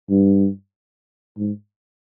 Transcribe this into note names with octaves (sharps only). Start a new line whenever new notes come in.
G2
G#2